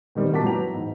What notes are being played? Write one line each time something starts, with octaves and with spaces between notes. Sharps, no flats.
B2 D#3 G3 C4
F#2 A#2 F#4 A5 D6 B6
F#3 E4 B4 G5 A#5 F7
E2 G#2